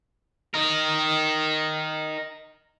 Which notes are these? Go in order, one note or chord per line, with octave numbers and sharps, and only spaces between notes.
D#4 A#4